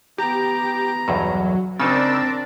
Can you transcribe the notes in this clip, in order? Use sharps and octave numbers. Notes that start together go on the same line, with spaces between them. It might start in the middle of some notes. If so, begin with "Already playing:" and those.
B3 G4 A#5
B1 E2 G2 F#3
C#3 G#3 C4 D4 D#4 A#4 D5 E6